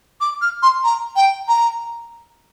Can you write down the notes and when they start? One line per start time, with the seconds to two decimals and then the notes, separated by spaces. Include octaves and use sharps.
0.21 D6
0.42 F6
0.63 C6
0.84 A#5
1.16 G5
1.48 A#5